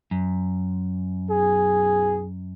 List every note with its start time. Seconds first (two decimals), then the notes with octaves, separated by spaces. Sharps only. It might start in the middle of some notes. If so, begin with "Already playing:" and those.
0.11 F#2
1.30 B1 G#4